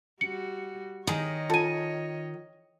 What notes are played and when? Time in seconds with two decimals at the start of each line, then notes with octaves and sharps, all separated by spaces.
0.21 G3 F#4 C#7
1.07 D#3 D#4 G#4 C#5 D#5
1.50 F4 A4 G#5 D#7